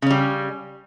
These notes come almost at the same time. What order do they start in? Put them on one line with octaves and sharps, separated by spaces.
C#3 C#4 G3